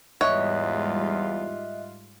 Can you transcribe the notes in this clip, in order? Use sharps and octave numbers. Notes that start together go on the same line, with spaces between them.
E2 G#2 G3 F4 C#5 D#5 E5 F#6